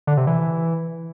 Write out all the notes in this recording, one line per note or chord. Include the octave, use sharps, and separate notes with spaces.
D3
C3
E3